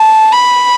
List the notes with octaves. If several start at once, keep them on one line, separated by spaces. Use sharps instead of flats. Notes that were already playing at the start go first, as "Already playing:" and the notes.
Already playing: A5
B5